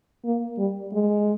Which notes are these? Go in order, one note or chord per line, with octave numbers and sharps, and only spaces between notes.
A#3
G3
G#3